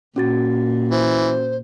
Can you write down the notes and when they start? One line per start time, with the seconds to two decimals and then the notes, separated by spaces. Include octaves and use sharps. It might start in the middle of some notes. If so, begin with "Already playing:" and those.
0.16 A#2 C#4 F#4 A6
0.91 E3 C5